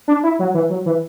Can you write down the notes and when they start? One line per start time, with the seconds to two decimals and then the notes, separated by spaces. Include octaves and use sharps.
0.08 D4
0.23 E4
0.39 F#3
0.54 E3
0.70 F#3
0.86 E3